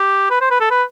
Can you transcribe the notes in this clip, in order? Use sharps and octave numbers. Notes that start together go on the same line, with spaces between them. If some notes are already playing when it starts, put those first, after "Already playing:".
Already playing: G4
B4
C5
B4
A4
B4